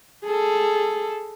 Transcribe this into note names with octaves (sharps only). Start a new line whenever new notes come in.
G#4 A4